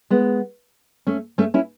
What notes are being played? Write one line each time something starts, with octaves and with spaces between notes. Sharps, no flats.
G#3 B3
A3 C#4
A3 C#4
C#4 E4